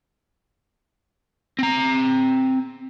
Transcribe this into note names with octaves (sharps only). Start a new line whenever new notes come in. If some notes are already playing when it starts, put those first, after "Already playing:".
C4 A#5